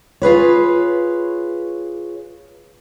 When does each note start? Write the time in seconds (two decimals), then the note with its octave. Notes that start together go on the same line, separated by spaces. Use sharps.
0.22 F4 G#4 B4 C#5